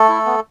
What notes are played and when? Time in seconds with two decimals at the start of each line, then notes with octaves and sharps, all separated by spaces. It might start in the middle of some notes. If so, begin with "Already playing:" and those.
Already playing: A3 A4
0.09 E4
0.26 B3